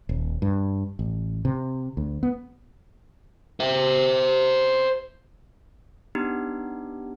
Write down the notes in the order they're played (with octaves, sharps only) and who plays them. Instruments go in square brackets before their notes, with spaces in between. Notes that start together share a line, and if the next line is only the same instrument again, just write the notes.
[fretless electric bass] D#1
G2
A1
C3
D2
B3
[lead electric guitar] C5 E5
[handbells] B3 D4 D#4 G4